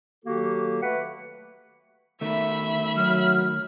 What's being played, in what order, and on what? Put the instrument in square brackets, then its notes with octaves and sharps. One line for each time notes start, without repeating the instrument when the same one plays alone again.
[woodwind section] D#3 F#3 A#3 F#4 G4 A4
A3 B4 F#5
[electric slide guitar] D#3 A3 [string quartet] E5 B5
[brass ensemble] F#3 [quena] F6